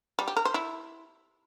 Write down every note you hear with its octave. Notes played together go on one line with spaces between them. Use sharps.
G3
G4
A#4
C5
E4